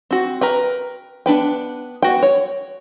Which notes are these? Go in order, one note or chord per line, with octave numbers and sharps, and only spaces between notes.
C4 F#4
A#4 B4 G5
B3 D4 B4 G5
B3 F#4 G5
C#5